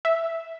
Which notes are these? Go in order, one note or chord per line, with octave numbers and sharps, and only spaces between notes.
E5